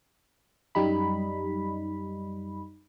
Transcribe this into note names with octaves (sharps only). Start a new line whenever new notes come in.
F#2 G3 D#4 B5